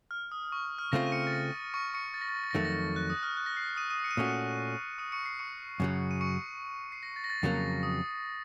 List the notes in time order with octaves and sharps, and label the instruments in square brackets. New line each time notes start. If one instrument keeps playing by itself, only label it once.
[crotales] F6
D#6
C#6
F6
[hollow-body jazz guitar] C#3 A3 C4 F4 [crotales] A#6
[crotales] D#7
C#6 C#7
A6
A#6
C#6 C#7
C#6 C#7
A6
A#6
A6
A#6
A6
A#6
[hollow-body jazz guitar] F2 D#3 F#3 A3 [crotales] A6
[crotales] A#6
A6
F#6
D#6
F6
F#6
A#6
C7
D#6 D#7
D#6 D#7
C#7
D#7
[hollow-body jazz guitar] A#2 A3 C#4 F#4 [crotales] C#6 C#7
[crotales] D#6 D#7
C#6 C#7
C7
C#6 C#7
[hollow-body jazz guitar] F#2 C#3 F#3
[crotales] D#7
C#6 C#7
C7
A#6
A6
A#6
A6
[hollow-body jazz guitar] F2 C#3 F#3 A#3
[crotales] D#6